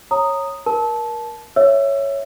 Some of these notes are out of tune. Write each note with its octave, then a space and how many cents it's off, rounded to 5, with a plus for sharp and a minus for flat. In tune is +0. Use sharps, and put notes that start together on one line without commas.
C#5 -15 A#5 -10 D#6 -5
A#4 +25 A5 -15
C#5 +0 E5 +5 E6 +25